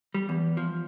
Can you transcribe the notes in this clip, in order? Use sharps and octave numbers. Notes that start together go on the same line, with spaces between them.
G3
E2
F3